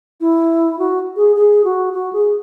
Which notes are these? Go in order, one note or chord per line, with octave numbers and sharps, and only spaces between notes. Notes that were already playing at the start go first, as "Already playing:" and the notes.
E4
F#4
G#4
G#4
F#4
F#4
G#4